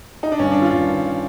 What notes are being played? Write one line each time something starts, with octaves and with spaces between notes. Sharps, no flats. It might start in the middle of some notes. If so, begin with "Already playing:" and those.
D#4
D4
G2 C#4
D#3 D4
F4
G2
D#3